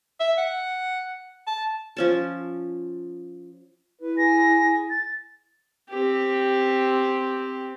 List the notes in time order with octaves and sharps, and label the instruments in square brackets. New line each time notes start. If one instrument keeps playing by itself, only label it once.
[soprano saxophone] E5
F#5
A5
[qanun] F3 C#4 A5
[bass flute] E4 [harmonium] B4
[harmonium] G#4 G#5 [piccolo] A#6
[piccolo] A6
[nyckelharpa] C4 G4